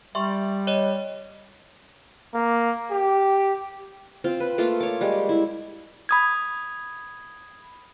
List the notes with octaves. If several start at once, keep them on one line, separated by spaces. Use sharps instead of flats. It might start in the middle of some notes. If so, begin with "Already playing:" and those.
G3 E5 C6 C#6
C#5 D#5
A#3
G4
C4 F4
B4
A3 A#3 F4
C#5 D6
G3 G#3
E4
B5 D#6 G#6